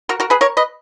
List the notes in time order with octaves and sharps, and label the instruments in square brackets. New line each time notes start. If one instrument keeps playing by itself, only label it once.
[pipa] F#4 A#4
F#4 A#4
G#4 B4
A#4 C#5
B4 D#5